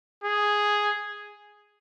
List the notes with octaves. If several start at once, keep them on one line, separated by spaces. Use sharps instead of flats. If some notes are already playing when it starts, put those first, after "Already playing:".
G#4